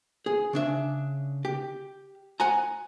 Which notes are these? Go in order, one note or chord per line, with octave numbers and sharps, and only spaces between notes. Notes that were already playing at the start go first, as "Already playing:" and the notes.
G#4
C#3 D4 E5
G4
F#5 G#5 A#5